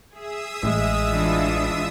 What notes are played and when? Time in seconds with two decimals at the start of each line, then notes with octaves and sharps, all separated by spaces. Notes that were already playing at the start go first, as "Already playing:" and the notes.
0.14 G#4 E5 D#6 E6
0.63 A1 G#3
1.10 E3 D4 F4